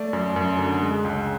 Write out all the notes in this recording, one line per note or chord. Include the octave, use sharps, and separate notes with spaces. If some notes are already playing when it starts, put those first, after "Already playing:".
Already playing: A3 D5
F#2
F#2
D3
G#3
C#2